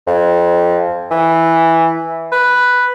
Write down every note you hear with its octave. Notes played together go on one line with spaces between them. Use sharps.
F2
E3
B4